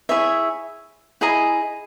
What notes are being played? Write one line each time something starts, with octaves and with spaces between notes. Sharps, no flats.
E4 G#4 C#5 E5
E4 G#4 D#5 A#5